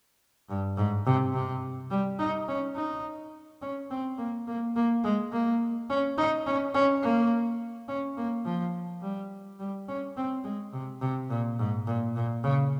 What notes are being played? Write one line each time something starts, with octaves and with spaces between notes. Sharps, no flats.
G2
G#2
C3
C3
G3
D#4
C#4
D#4
C#4
C4
A#3
A#3
A#3
G#3
A#3
C#4
D#4
C#4
C#4
A#3
C#4
A#3
F3
G3
G3
C#4
C4
G#3
C3
C3
A#2
G#2
A#2
A#2
C#3